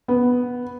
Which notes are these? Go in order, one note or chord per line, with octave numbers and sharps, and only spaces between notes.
B3